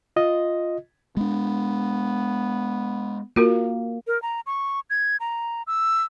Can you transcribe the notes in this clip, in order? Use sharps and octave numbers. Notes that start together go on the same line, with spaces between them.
F4 D#5
G#3 B3 D4
A#3 F4 F#4 A#4
A#4
A#5
C#6
G#6
A#5
E6